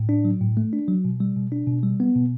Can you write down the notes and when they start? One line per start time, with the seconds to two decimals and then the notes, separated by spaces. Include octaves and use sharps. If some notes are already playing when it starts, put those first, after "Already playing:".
Already playing: A2
0.09 D4
0.25 F#3
0.41 A2
0.57 A3
0.73 D4
0.88 F#3
1.05 B2
1.20 G3
1.37 B2
1.52 D4
1.67 B2
1.83 G3
2.00 B3
2.15 B2